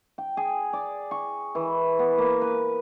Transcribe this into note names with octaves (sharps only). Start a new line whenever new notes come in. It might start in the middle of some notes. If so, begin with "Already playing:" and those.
G5
G#4
D5
C#6
E3
B3
A#3
B4